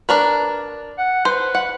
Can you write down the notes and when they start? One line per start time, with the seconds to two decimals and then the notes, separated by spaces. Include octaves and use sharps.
0.09 D4 A#4 B4
0.98 F#5
1.25 B4 C5
1.55 F#5